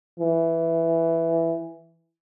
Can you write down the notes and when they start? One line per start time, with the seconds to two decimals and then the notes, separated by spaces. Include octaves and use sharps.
0.20 E3